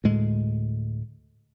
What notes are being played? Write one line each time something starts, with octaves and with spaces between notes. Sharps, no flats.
D2 A2 G#3